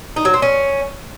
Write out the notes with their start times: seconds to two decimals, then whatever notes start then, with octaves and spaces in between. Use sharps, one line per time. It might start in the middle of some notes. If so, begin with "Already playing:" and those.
0.16 D#4
0.25 F#3
0.34 C4
0.42 C#4